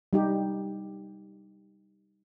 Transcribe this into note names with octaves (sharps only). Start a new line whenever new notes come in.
G3 D#4 G4